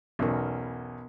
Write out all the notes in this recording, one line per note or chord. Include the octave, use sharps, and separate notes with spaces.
B1 E2 B3 C#4 A#4